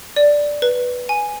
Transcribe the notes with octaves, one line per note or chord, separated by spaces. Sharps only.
D5
B4
G#5